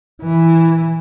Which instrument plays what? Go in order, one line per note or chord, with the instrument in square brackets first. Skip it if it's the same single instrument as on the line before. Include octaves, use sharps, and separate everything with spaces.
[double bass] E3